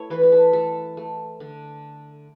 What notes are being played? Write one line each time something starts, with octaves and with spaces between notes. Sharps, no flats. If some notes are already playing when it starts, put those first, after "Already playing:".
Already playing: A3 E4 C#5
E3 B4
B4
A4
A3 A4
A3
D3